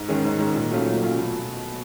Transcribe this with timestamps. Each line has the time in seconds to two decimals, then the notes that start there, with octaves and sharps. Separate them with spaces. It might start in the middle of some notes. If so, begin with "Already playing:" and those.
Already playing: G#2
0.08 D#3 G#3 C#4
0.24 G#2
0.39 D#3 G#3 C#4
0.54 A#2
0.70 F#3 A3 C#4 F4
0.85 A#2
1.01 F#3 A3 C#4 F4
1.16 B2